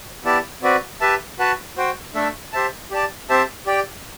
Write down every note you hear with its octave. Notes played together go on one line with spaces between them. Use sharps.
B3 E4 G4 D5 A5
C4 F#4 B4 D5
G4 B4 E5 A5
F#4 B4 F#5 A5
F#4 C5 G5
A3 D4 A4 E5
G4 C5 E5 A5
G4 D5 A5
C4 G4 C5 E5 A5
G4 D5 G5